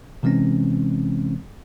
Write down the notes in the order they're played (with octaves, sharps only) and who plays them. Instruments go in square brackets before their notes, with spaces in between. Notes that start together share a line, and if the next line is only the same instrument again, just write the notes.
[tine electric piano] C3 E3 G#3 C4 C#4